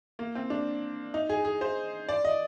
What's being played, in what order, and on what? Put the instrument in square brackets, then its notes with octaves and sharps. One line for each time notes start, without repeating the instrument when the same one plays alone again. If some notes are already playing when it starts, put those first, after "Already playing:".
[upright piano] A#3
C4
D4
D#4
G#4
G#4
C5
D5
D#5